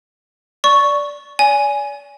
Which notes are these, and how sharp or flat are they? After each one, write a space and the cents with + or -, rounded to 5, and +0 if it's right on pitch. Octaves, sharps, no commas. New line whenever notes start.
D5 -10 C#6 +0
D5 -35 G#5 +0